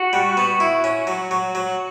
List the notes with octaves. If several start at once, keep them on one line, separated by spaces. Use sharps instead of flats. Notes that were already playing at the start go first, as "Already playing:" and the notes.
Already playing: F#4
G3
B3
E4
C#4
F#3
F#3
F#3